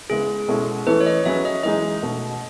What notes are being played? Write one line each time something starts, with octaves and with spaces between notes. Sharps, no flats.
C#3 G#3 B3 E4 G#4
B2 G#3 C#4 E4 A4
E3 A3 C#4 E4 A4 B4
C#5
D#5
F#3 C#4 G#4 B4 E5
D#5
E3 G#3 D#4 G#4 D#5
B2 A3 C#4 F#4